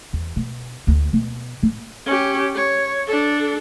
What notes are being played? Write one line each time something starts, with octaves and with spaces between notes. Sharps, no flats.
E2
B2
D2
B2
A2
C#4 G4
C#5
D4 A4